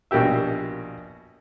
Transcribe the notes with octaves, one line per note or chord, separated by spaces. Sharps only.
A#1 B2 A#3 G4 E5